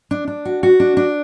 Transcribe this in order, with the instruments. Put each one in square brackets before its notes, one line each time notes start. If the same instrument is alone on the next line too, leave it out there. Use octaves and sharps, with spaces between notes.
[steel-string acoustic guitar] D4
D4
F#4
F#4
D4
D4